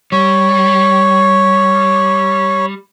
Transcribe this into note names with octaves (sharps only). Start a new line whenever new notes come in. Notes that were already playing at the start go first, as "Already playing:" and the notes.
G3 C#5